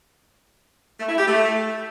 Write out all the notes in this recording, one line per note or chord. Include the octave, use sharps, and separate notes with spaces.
A3
E4
G4
A3